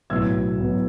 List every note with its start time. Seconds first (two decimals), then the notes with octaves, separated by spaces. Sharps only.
0.10 B1 A2 F#3 B3 E6 G#6
0.58 B1 A2 F#3 B3